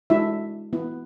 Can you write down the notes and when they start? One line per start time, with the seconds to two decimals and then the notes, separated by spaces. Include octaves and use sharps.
0.10 G#3 D4 E4 F#4 E5
0.73 B3 E4